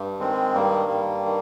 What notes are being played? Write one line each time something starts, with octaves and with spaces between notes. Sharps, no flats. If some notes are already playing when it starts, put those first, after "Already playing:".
Already playing: G2
D#3 G#3 C4
G2 G3 A#3
G2
D#3